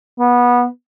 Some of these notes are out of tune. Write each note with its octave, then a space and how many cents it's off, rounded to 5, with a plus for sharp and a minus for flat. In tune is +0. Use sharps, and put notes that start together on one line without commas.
B3 -20